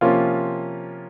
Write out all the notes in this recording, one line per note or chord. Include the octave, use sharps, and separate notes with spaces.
C3 F3 A#3 C#4 F4